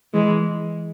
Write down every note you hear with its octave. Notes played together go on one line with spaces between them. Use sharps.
E3 G#3